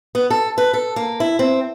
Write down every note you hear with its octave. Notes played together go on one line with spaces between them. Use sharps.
B3
A4
B4
A4
A#3
E4
C4